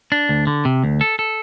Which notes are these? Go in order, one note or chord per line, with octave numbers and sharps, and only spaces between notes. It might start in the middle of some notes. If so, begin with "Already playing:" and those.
D4
D2
D3
C3
D2
A4
A4